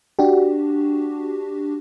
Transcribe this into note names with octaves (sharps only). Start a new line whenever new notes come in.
D4 F#4 G4